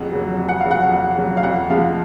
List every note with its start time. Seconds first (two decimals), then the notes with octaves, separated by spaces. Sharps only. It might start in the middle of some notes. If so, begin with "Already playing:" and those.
Already playing: F2 C#3 F#3 F#5
0.12 C#3 F#3
0.37 F2
0.48 F#5
0.61 C#3 F#3 F5
0.71 F#5
0.90 F2
1.16 C#3 F#3
1.37 F5
1.43 F2 F#5
1.70 F3 G#3 F5